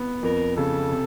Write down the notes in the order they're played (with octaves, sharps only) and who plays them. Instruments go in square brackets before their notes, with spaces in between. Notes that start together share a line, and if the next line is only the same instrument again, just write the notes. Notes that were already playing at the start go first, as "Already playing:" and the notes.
Already playing: [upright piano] B3
[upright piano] F2 [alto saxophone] A#4
[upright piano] C#3 [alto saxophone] A4
[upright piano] C3